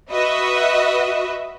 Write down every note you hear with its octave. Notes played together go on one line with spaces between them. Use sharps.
F#4 B4 D#5 E5